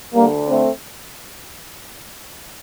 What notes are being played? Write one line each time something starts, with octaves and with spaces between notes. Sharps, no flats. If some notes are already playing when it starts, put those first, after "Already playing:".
D2 D3 G3 A#3
A3 C4